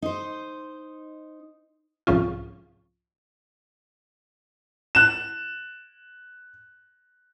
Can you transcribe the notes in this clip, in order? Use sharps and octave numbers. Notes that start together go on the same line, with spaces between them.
D#4 C5
C2 G#2 F3 C#4 F4
F#6 E7